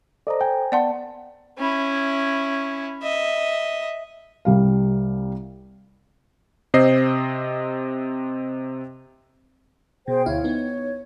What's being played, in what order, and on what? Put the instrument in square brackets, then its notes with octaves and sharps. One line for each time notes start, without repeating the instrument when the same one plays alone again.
[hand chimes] A4 C5 A#5 [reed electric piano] D5 D#5
[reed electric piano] G5 [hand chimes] G#5
[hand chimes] B3 A5 [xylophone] D5 F#5 C6
[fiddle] C#4 E4
D#5 E5
[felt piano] C2 G3 F5
[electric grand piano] C3 C4 C5 D#5 C7
[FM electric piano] B2 [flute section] G#4 C5 G5
[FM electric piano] D2 E4 F5 [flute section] C#5
[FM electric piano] B3 D#4